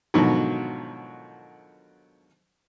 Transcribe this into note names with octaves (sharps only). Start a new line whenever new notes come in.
G#2 B2 D3 D#3 F3 F#3